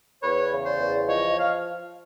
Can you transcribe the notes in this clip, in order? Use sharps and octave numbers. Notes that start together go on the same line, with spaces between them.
E2 B4 C#5
C#3
C5 D5
E2
F3 C#5 D#5
F5